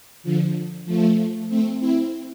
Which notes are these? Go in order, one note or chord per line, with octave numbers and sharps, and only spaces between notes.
D3 F3
F3 A3
A3 C4
C4 E4